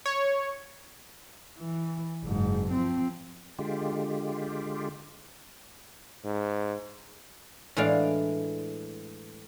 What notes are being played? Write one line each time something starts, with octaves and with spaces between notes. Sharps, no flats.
C#5
E3
F#1 G#2
F3 C4
D3 G#3 F4 G4
G#2
A2 E3 G#3 D4 D5 F5